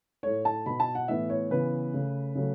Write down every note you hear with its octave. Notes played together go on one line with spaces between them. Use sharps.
A2 A3 C#5
A5
B2 B3 B5
A5
F#5
A2 E3 B3 E5
C#5
C#3 E3 B3 B4
C#3 A3
C#3 F#3 A3